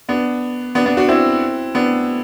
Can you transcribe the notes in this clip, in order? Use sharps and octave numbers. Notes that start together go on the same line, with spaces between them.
B3 D4
B3 D4
B3 D4
D4 F#4
C4 E4
B3 D4